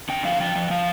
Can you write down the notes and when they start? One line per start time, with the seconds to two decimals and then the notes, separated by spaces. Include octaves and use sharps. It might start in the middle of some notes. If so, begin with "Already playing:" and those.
0.09 D3 G5
0.25 F3 F5
0.40 F3 G5
0.56 F3
0.70 F3 F5